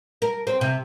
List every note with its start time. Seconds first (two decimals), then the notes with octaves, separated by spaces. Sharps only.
0.22 A#4
0.47 C4
0.61 C3